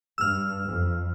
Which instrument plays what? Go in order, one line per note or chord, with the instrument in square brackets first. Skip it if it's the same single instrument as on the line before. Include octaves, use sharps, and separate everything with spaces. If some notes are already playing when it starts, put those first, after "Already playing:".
[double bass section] G2 [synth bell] E6 F6
[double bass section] F2